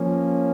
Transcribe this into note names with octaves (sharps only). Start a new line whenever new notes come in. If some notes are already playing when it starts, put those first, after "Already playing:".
Already playing: F3 A#3 C#4